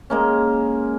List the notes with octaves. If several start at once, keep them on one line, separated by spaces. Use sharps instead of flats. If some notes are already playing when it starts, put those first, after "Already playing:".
G#3 A#3 C#4